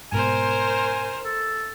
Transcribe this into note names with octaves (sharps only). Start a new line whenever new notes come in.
G#2 B2 A#4 C5 G#5
A4